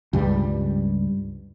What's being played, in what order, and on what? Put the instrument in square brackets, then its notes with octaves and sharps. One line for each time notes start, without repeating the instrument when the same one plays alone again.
[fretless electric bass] C#2 G2 G3